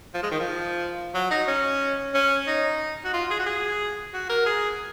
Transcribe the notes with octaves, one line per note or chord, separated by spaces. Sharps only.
F3
G#3
D#3
F3
F#3
D#4
C#4
C#4
D#4
F#4
F4
G#4
F#4
G#4
F#4
A#4
G#4